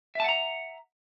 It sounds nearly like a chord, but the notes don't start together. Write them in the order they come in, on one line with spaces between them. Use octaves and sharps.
E5 A5 F#5 A#5